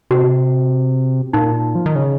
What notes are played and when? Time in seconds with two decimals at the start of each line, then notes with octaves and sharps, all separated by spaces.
0.11 C3 F#4
1.33 A#2 D#4
1.75 F3
1.86 D#3
1.95 C#3